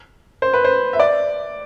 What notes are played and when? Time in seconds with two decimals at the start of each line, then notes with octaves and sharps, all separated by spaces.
0.42 C5
0.54 B4
0.65 C5
0.93 E5
1.00 D5